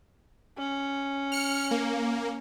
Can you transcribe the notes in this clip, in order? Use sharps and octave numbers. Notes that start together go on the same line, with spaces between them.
C#4
F6 C#7
A#3